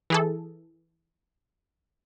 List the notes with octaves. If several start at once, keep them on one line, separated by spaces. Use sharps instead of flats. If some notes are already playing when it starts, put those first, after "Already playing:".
E3 G#4 A4